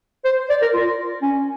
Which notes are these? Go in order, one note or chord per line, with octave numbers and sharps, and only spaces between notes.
C5
D5
A#4
F4
C#4